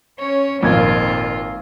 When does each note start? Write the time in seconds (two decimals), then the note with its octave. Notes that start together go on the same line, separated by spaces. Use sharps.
0.19 C#4 C#5
0.63 G#1 F2 A#2 A#3 F4 G#6